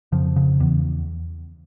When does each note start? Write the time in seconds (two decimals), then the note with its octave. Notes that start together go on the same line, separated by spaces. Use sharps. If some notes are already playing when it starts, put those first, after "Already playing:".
0.12 F2 C#3 F3
0.36 C#3
0.60 E2